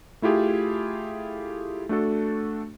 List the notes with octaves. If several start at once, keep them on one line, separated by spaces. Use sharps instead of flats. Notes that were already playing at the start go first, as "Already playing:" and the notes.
A3 E4 F4 G4 G#4
A3 D4 F#4 A4